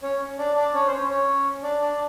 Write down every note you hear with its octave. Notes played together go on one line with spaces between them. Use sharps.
C#4 C#5
D4 D5
D4 D5
C#4 C#5
C5
C#4 C#5
C#4 C#5
D4 D5
D4 D5